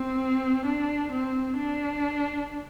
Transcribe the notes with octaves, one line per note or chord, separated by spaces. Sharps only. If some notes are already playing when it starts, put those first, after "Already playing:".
Already playing: C4
D4
C4
D4